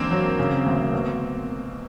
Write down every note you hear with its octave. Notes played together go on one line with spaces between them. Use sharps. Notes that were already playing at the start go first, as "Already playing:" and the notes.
Already playing: E1 D3 A#3 C4
F#3
C#3
D2
B2